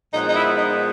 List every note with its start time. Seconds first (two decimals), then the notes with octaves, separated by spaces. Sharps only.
0.13 A#2 F3 G#3 B3 D#4
0.29 D#4
0.36 E4
0.58 D#4